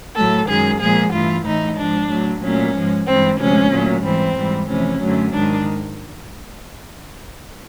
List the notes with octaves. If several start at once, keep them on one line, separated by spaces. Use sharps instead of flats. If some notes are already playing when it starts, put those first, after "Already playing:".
A2 F#3 A3 A4
F#2 D#3 G#3 G#4
A#2 F3 G#3 G#4
G2 E3 A3 F4
A2 E3 A3 D#4
G#2 F3 G#3 D4
A2 F#3 A3
A#2 F#3 A3 C#4
G#2 F3 G#3
G2 E3 G#3 C4
D2 C3 F3 G#3 C#4
A#2 F#3 A3
G#2 E3 G3 C4
G#2 E3 G3
F2 C3 E3 A3 C#4
F#2 D3 F#3 A3
G#2 D#3 G#3 D4